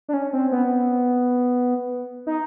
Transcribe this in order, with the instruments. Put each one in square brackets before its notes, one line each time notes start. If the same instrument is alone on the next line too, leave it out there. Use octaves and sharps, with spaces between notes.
[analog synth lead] D4
C#4
C4
B3
D#4